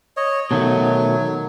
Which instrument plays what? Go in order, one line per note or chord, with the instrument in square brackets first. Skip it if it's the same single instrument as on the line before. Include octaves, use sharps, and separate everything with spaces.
[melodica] C#5 D#5
[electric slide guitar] B2 D#3 A3 [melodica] F#3